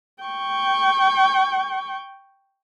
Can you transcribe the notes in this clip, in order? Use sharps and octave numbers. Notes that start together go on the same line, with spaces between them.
G5 C#6